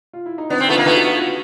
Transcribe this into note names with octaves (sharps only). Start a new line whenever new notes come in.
F4
E4
D#4
B3 C4 D4
C4
A3 B3 D#4 F4
A#3
A3 B3 F4
F#4
F4
F#4